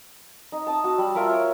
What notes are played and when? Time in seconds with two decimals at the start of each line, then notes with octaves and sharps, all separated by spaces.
0.52 D#4
0.67 A5 D#6
0.84 F#4 E6
0.98 G3
1.15 F4 A#4 E5 A#5
1.30 C#5